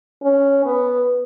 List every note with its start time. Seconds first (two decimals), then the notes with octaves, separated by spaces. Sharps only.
0.23 C#4
0.65 B3